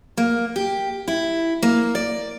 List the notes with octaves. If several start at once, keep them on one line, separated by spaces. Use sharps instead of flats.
A#3
G4
E4
A#3
D5